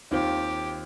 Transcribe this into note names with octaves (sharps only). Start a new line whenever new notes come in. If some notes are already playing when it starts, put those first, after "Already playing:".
D#2 D#3 C4 F4 G4